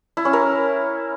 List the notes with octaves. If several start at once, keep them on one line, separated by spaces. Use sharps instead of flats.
E4
C#4
A#4